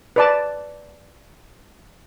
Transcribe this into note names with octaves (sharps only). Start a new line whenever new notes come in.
B4 D5 A5